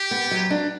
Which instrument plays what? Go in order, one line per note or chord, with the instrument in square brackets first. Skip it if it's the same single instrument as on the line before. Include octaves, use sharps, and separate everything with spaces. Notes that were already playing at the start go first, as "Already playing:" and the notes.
Already playing: [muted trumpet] G4
[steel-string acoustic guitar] B3
F#3
D4